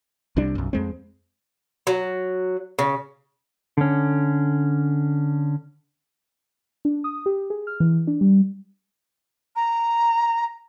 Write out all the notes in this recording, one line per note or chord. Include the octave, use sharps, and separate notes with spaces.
C2 C3 G3 D4
B1 F#2
F2 G#3 C4
F#3
C#3
D3 C#4
D4
D#6
G4
G#4
F6
E3
D4
G3
A#5